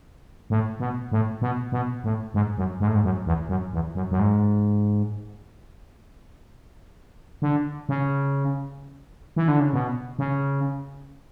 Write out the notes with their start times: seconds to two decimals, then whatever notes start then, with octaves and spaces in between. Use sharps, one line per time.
0.50 A2
0.80 B2
1.12 A2
1.42 B2
1.72 B2
2.04 A2
2.34 G#2
2.58 F#2
2.80 G#2
2.87 A2
2.95 G#2
3.04 F#2
3.26 E2
3.49 F#2
3.73 E2
3.95 F#2
4.11 F#2
4.19 G#2
7.42 D3
7.89 C#3
9.36 E3
9.48 D3
9.60 C#3
9.73 B2
10.19 C#3